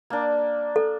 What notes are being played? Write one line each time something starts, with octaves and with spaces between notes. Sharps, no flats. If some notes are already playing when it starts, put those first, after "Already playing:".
A#3 D4
A4